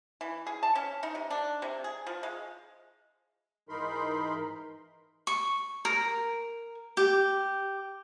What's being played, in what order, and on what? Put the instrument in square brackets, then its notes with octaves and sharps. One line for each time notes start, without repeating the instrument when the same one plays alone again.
[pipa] E3
G#4
A5
C#4
D#4
C3
D4
C3
G#4
F3
G#3
[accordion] G#2 E3 D#4 A#4 B5 C6
[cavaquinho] C#6
A#4
G4